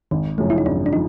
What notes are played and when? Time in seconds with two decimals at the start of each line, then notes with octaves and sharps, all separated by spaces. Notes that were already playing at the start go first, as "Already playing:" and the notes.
0.11 G#1 D#3
0.38 F#2 C#3 F3 A3
0.50 E4
0.58 D#4
0.66 G#1 D4
0.86 D4
0.93 F3 D#4